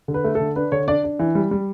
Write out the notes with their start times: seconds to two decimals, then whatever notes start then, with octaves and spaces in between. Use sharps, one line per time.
0.08 D3
0.14 B4
0.24 A3
0.35 D3 A4
0.56 D4 B4
0.72 D3 C#5
0.88 D4 D5
1.04 D4
1.19 E3
1.35 G3
1.51 G3